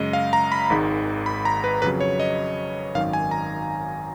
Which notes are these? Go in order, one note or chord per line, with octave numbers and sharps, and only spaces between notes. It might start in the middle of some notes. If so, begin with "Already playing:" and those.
Already playing: F#2 C#3 G#3 D#5
F5
A#5
B5
G#1 G#2 D#3 G#3
B5
A#5
B4
F2 C#3 F#3 B4
C#5
D#5
G#1 F#2 D#3 F5
G#5
A#5